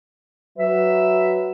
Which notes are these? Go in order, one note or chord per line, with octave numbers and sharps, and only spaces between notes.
F#3 B4 E5